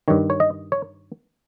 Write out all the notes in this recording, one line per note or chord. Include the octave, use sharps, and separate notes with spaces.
G2 D#3 C#5
C#5
D#5
C#5